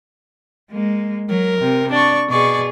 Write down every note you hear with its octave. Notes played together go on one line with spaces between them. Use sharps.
G#3 A#3
F#3 A#4
C3
D4 D5 C#6
B2 G#4 D5 C#6